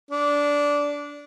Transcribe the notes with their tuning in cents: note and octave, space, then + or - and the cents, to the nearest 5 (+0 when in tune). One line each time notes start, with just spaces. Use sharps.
D4 -15